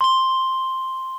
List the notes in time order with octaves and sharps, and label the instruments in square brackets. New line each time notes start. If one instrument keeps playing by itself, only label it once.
[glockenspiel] C6 G7